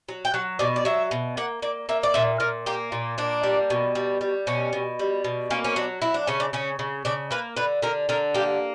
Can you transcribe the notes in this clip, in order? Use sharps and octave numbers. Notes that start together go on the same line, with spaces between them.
F#3
G5
F#3 F#5
B2 D5
D5
F#3 E5
B2
A#3 F#5
A#3 D5
A#3 E5
D5
A#2 E5
A#2 A#4
A#3 G4
A#2
A#3 D4
G3
B2
G3
G3
B2 C#4
B2
G3
B2
A#3 C#4
C#4
F#3 D4
F#3 E4
D4
C#3 C#4
D4
C#3 C#4
C#3
C#3 D4
A#3 B4
D3 B4
D3 A#4
D3 A#4
A#3 G4